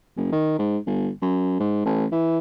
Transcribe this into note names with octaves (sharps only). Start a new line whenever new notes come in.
F#1
D#3
G#2
G1
F#2
G#2
A1
E3